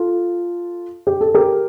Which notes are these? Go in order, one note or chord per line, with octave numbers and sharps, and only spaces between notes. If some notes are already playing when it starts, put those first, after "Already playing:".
Already playing: F4 A4
G4
A4
G4 A#4